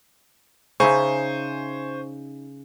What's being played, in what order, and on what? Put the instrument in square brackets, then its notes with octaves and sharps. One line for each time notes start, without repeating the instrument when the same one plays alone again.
[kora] C#3 D#4 E5 [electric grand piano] C5 G#5 C#6